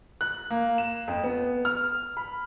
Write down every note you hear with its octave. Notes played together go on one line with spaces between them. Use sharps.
F#6
A#3
E7
F2
B3
F6
B5